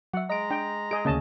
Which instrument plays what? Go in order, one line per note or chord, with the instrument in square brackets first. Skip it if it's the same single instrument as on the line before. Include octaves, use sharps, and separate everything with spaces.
[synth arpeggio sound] F#3 E5 [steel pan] F#5
[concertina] G#3 A#5 [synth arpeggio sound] D#5 D7
[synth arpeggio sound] D4 [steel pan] G5
[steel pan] G#4 D#5 [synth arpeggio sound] D7
[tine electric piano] D2 C#3 [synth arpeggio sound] A#3 [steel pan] C#4 D#5 A5